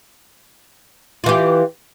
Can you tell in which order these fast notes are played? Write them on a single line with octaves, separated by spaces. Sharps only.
F4 E3 G4